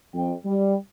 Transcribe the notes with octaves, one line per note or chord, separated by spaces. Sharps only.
F2 G5
G3